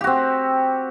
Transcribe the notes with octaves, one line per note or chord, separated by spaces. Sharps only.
C4 F#4 G4